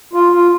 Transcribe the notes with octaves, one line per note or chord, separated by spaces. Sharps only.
F4
F4